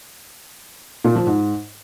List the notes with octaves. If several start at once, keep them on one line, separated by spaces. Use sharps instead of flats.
A#2
F3
G#2